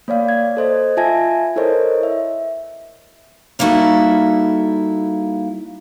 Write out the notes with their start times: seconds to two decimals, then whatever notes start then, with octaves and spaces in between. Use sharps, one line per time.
0.08 A#3 C#5 D5 F5
0.29 G#6
0.57 A4 C5 D#5
0.97 F4 E5 G#5 A5 G#6 A#6
1.56 E4 A4 A#4 C5 C#5 D#5
2.03 E5
3.59 G3 A#3 D#4 E4 F#4 A4